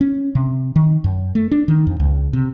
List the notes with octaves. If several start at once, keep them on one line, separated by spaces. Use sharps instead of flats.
C#4
C3
D#3
F#2
A3
D4
D#3
F2
C#2
C3